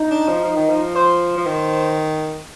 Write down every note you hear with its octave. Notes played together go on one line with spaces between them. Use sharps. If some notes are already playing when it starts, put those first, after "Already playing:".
Already playing: D#4
D4
F3
F3
D#3
F3
C5
F3
D#3